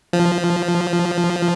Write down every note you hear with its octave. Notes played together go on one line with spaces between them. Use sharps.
F3